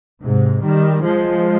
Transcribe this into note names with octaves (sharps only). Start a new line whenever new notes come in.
G#2 C3
D#3 G3
F3 G#3